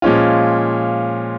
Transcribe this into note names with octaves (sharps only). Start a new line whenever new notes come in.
A#2 F3 G#3 C#4 F4